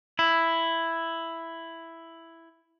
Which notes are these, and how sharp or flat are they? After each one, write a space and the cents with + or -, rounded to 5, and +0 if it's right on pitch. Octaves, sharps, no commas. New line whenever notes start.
E4 +5